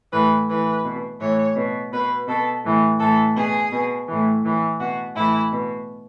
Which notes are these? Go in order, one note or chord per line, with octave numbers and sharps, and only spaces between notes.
A2 E3 B4
A2 E3 B4
B2
A2 E3 C#5
B2
B2 B4
B2 A4
A2 E3
A2 E3 A4
B2 G#4
B2
A2 E3
A2 E3
B2 F#4
A2 E3 E4
B2